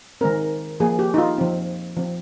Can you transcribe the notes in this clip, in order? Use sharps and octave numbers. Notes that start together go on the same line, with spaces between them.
D#3 G#3 C4 A#4
F3 A#3 G#4
G4
D#4
F4
F3 C4
F3 C4